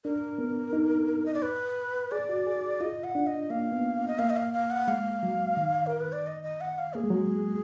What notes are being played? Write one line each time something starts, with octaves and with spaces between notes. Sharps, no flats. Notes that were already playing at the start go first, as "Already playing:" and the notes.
D4 A#4
B3
D#4
D#5
D5
B4
G#4 D5
F#4
G#4
F4 D#5
F#5
D4
D#5
A#3 F5
B3
D#5
A#3 F5
D#5
F5
F5
F#5
G#3 F5
F#3
D#3
A#4
B4
D5
D#5
D#5
F#5
F5
A#3 G#4
G#3
F#3
G#3